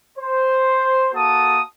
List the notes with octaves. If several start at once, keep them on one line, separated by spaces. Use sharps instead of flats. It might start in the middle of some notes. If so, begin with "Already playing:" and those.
C5
A#3 F#4 A4 A5 D#6